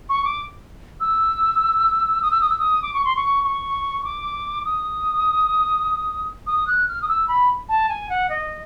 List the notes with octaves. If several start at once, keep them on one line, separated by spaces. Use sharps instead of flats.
C#6
D6
E6
D#6
E6
D#6
E6
D#6
D6
C#6
C6
C#6
C#6
D6
D#6
D#6
F#6
F6
D#6
E6
B5
A5
G#5
F#5
D#5